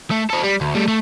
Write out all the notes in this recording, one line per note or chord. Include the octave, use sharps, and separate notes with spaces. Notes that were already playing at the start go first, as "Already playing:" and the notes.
A3
A4 C5
G3
D2
G3 A3
A3